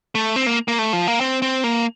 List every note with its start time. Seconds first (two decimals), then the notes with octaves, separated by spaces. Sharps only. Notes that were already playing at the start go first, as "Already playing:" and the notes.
0.15 A3
0.36 C4
0.46 A#3
0.68 A#3
0.79 A3
0.93 F3
1.08 A#3
1.21 C4
1.42 C4
1.64 A#3